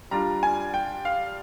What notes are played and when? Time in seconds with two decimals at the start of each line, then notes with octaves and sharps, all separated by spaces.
0.11 G3 D4 F4 A#5
0.43 G#5
0.74 G5
1.05 F5